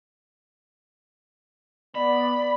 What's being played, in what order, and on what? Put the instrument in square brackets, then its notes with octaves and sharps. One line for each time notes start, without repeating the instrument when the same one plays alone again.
[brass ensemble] B3 D5 [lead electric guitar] B5